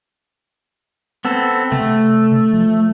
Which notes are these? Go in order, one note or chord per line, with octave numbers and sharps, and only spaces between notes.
B3 C4 A4
C3 A3
F3